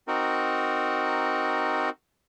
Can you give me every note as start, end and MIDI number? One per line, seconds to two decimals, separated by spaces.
0.08 1.90 60
0.08 1.90 63
0.08 1.90 66
0.08 1.90 70